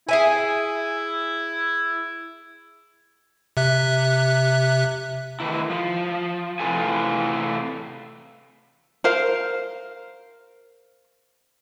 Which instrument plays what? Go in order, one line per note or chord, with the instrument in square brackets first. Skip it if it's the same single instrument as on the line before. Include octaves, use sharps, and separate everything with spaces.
[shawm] E4 [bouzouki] G#4 E5 G#5
[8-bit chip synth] C3 E5 F#6
[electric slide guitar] A2 D#3 E3 E4
F3
A2 C3 E3 F4 A4 G#5
[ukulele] A#4 C5 F5